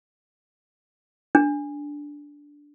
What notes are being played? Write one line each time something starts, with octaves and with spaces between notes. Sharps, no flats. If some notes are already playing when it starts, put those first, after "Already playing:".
D4